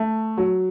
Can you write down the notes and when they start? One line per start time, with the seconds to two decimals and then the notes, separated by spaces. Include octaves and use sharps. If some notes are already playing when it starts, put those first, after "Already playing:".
Already playing: A3
0.37 F#3